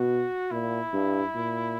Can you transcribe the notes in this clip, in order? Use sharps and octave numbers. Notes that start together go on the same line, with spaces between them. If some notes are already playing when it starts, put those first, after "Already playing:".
Already playing: B2 F#4
A#2 E4
G2
A#2